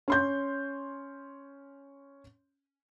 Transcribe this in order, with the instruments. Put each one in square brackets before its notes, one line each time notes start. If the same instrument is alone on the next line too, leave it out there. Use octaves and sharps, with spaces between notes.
[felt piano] C#4 C6 G6